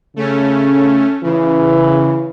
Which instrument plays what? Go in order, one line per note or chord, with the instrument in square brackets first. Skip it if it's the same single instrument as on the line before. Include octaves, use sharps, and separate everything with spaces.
[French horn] C#3 [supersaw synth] A3 C#4
[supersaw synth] C#3 [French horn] E3